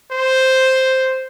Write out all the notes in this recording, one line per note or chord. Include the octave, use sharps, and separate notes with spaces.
C5